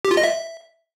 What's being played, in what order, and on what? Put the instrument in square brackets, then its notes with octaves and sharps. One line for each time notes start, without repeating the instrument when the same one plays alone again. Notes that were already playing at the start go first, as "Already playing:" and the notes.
[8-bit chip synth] G4
F4
D#5
E5